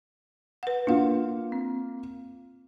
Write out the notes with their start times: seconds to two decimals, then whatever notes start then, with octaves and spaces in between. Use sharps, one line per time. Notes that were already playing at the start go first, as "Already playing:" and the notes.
0.63 B4 F#5
0.87 A#3 D4 F4 F#5
1.52 C4